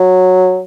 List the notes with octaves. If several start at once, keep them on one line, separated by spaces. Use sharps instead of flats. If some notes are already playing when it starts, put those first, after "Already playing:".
Already playing: F#3